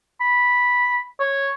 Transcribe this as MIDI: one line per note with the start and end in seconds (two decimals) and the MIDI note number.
0.21 1.04 83
1.20 1.50 73